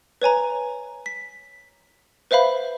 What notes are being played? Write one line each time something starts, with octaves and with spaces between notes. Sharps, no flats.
B4 C#5 G#5 A#5
B6
B4 C5 E5 F5 B5